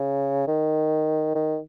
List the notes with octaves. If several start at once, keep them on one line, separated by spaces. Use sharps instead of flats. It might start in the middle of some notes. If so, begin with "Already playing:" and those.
Already playing: C#3
D#3
D#3